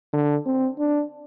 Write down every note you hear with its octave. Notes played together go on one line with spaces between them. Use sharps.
D3
C4
D4